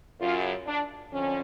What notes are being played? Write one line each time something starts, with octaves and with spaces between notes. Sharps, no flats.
F#2 C#3 F4
D4
F2 D3 C#4